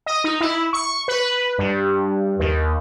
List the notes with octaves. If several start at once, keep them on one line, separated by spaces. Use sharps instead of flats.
D#5
D#4
E4
C#6
B4
G2
D#2